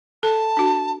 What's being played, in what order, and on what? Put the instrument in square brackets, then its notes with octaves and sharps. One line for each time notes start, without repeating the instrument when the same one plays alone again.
[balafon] A4 [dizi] A5
[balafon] D4 F#4